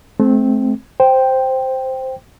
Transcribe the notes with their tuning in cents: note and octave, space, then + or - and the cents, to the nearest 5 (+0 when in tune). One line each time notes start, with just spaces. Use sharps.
A3 -35 C4 +0
C5 +0 G5 +0